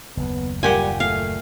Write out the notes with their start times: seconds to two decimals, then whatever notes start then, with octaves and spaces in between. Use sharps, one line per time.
0.17 F#1 D#2 B3
0.63 A#2 G3 G4 F#5 G#5
1.00 A3 F5